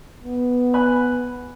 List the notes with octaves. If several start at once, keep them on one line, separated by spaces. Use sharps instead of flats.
B3
G#5 B5 F#6